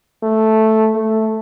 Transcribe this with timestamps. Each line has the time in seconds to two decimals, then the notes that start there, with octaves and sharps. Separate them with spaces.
0.23 A3
0.95 A3